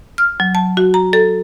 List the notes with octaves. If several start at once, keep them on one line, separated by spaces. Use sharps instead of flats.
F6
F#3
A5
F#4
A#5
A4